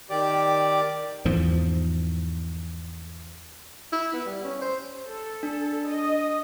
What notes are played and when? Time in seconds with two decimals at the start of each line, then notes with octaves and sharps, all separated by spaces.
0.10 D#3 G4 D5 D6
1.25 E2 G#2 F3
3.93 E4
4.13 B3
4.26 G3
4.44 C#4
4.61 C5
5.08 A4
5.43 D4
5.90 D#5